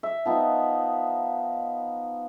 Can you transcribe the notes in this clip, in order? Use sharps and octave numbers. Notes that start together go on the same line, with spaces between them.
E5
F3 B3 D#4